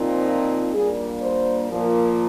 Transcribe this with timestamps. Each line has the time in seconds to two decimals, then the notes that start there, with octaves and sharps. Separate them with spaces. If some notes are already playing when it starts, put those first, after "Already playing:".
Already playing: A#2 F3 C4 D#4
0.74 A#2 G3 A#3 D4 G#4
1.22 C5
1.70 A#2 F3 A#3